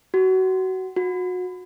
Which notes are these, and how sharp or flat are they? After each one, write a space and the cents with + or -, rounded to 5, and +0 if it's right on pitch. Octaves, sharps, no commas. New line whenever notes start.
F#4 +25
F#4 -30